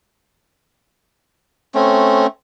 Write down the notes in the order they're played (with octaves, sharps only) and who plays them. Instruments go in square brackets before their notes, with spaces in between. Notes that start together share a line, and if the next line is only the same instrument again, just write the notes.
[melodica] A3 C4 C#4